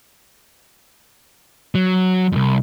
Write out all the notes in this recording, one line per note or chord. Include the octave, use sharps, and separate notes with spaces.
F#3
C2 F2